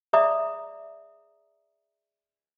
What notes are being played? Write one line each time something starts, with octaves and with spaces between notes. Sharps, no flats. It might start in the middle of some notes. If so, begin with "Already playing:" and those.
G#4 D5 E5 A#5 D#6